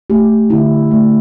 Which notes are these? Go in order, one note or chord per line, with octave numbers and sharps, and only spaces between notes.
A3 G4
D3 E4
A3